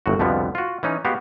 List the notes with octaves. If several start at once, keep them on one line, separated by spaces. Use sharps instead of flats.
G1 A2 F#4
C2 F2 B2 D3 F3 B3
F4 F#4
E3 C#4 D#4
G#3 B3 F#4 G4 F5